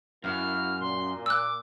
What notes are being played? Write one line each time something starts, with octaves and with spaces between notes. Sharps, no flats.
F#2 A#3 E4 F#4 F6
A#2 C6
D6 E6 F#6